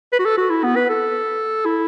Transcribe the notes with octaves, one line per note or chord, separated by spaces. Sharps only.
B4
F#4
A4
F#4
E4
B3
B4
A4
E4